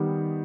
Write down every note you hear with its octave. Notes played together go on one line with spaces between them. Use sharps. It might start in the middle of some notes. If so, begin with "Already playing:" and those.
Already playing: D#3 G3 B3 G4